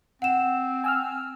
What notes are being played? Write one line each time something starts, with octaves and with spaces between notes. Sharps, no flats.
C4 F#5 E7
G#5 E6 F6